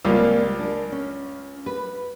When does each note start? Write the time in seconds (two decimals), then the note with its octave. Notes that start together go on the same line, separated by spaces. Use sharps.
0.05 C#2 G3 A#3 C4 F4
0.59 D4 A#4
0.92 C#4
1.66 B4